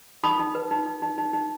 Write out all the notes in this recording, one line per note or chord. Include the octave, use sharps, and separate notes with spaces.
D#4 B5 D#6
D#4
B4
D#4
D#4
D#4
D#4
D#4